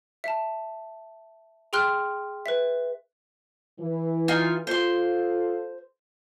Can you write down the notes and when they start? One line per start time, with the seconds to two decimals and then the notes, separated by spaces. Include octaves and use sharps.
0.24 E5 A5
1.73 G#4 G5 C6 F6 F#6
2.46 B4 E5
3.80 E3
4.28 D#4 F4 G#5
4.67 F4 A4 C5 C6